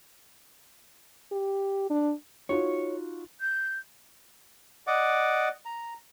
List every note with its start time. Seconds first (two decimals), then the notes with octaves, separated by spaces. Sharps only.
1.32 G4
1.90 D4
2.49 D#4 F4 F#4 C#5
3.40 G6
4.87 D5 D#5 F#5 D6
5.66 A#5